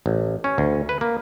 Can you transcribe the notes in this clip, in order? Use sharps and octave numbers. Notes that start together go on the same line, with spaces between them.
A1
C#4
D2
B4
A#3